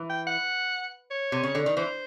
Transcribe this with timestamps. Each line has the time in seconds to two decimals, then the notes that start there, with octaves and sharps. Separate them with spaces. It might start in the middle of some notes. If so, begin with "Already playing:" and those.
Already playing: E3
0.10 G5
0.27 F#5
1.11 C#5
1.32 C3
1.43 C#3
1.55 D3
1.66 D#3
1.77 E3 C5